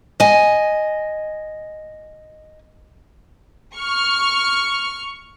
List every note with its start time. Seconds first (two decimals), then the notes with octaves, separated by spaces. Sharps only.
0.20 D#5 G#5
3.75 C#6 F6